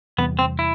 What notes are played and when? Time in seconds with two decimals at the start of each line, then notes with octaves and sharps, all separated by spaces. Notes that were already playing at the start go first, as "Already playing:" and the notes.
0.18 E2 C3 E3 G3 B3
0.39 C4
0.59 E4